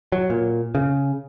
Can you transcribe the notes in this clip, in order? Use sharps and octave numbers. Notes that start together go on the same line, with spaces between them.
F#3
A#2
C#3